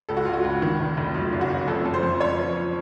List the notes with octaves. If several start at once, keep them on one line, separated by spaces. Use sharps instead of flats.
C#2 A4
F#4
C#2 F4
F#4
C#2
D#3
F1
F1
F#2 F4
F#1
F#4
F#1
F2 A4
F2
C5
F2
F3 C#5
F3